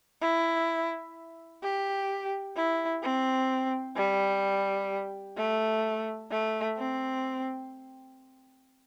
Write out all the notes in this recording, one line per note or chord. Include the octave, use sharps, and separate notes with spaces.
E4
G4
E4
C4
G3
A3
A3
C4